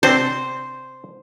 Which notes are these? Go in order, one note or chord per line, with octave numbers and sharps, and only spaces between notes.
C3 C4 D4 C5